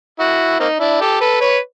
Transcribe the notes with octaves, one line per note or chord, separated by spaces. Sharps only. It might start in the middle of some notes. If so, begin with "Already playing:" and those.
E4 F#4
A#3 C4 D#4
D4 E4
G4 A4
A4 B4
B4 C#5